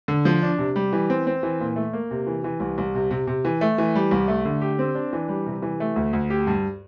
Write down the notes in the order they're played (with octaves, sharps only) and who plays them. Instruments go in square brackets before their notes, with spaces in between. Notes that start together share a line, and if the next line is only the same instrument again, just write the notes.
[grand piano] D3
F3
D4
C3
G3
E3
C4
C4
E3
A#2
A3
A#3
C3
E3
E3
C2
C2
C3
C3
C3
E3
A3
E3
G3
C2
A3
D3
G4
C4
D4
E3
G3
C3
E3
A3
D2
D2
G4
G2